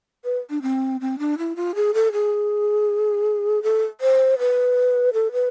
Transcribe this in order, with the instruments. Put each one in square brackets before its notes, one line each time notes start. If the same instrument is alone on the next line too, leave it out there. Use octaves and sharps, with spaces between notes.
[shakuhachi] B4
D4
C4
C4
D4
E4
F4
G#4
A4
G#4
A4
C5
B4
A4
B4